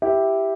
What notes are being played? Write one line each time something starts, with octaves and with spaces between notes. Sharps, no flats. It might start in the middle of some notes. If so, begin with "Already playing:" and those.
E4 G4